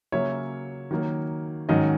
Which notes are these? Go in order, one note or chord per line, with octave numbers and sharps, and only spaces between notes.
C#3 F#3 A#3 C#4 C#5 E5
D#3 F#3 A#3
G#2 D#3 F#3 C#4 D#5